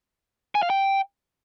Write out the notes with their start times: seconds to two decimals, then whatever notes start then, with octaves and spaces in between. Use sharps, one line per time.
0.55 G#5
0.63 F5
0.70 G5